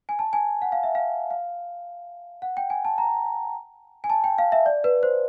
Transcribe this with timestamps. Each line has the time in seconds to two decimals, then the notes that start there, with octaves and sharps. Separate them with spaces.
0.09 G#5
0.19 A5
0.33 G#5
0.62 F#5
0.72 F5
0.84 E5
0.95 F5
1.30 F5
2.42 F#5
2.57 G5
2.70 G#5
2.85 A5
2.98 A#5
4.04 G#5
4.10 A5
4.24 G5
4.38 F5
4.52 E5
4.66 D5
4.84 B4
5.03 C5